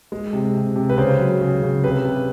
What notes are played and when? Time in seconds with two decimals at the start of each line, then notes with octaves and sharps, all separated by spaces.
0.12 G#3
0.33 C3
0.55 C3
0.76 C3
0.90 B4
0.98 C#3 C5
1.19 F#3
1.41 C#3
1.62 C#3
1.84 C3 B4
2.05 C3